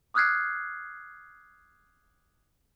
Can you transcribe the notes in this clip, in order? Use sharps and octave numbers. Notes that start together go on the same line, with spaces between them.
D6 D#6 F6 F#6 G#6 C7